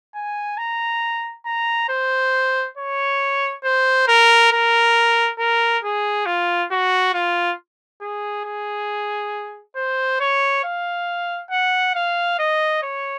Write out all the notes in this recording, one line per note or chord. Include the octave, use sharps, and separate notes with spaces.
G#5
A#5
A#5
C5
C#5
C5
A#4
A#4
A#4
G#4
F4
F#4
F4
G#4
G#4
C5
C#5
F5
F#5
F5
D#5
C#5